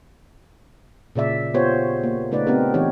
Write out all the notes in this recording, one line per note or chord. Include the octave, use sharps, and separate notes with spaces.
A#2 C#3 D5 E5
B3 F4 G4 C5 C#5
A#3
C#3 A3 D#4 B4 D5
B3 C4 D4 D#4 G4 A#4
E3 C4 D#4 G4 C#5